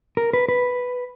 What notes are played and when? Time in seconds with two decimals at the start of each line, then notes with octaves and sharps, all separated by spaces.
0.17 A#4
0.33 B4
0.49 B4